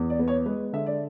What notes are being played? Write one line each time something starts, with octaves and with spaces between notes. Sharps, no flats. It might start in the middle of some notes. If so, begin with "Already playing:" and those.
Already playing: E2
D5
B3
C#5
G#3 B4
D3 E5
D5